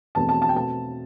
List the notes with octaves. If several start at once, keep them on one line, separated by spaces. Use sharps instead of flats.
E2 B2 A3 C4 A5
A5
A5
G5
B2 A3 C4 A5